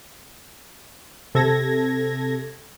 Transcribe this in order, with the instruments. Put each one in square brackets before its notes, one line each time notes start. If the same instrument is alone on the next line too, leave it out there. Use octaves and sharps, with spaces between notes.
[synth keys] C3 A4 G#6 A#6